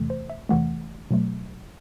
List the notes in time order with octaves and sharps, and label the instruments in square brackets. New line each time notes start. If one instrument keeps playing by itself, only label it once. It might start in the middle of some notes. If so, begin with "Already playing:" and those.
Already playing: [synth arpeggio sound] E2 C3 E3 A3
C5
E5
E2 C3 E3 A3 F#5
B2 F#3 A3